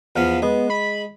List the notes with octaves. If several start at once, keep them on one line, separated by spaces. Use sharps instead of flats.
E2 F3 B3 F5
G#3 B3
B5